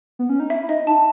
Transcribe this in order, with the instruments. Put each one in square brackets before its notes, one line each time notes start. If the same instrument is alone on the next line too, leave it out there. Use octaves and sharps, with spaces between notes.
[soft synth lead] B3
C#4
D#4
[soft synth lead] E4 [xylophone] E5
[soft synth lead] E4
[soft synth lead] D#4 [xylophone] D#5
[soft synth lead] D#4 [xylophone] A5